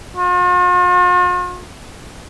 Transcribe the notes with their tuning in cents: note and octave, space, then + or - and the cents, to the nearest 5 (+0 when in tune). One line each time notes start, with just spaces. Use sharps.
F4 +45